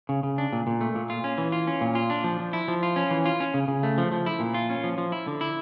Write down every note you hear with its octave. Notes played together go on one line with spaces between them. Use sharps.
C#3
C#3
D4
A#2
A#2
A3
A#2
F4
C#4
E3
F4
C#4
A#2
F4
D4
F3
F3
E4
F3
F4
C#4
E3
F4
C#4
C#3
C#3
A3
F3
F3
E4
A#2
F4
C#4
F3
F3
E4
D3
E4